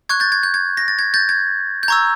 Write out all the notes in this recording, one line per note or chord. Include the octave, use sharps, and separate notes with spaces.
C#6 F#6 G#6
G6 A6
G#6
G6
G#6
A#6
A6
G#6
G6 A6
G#6
G6
A#5 C#6 E6 G#6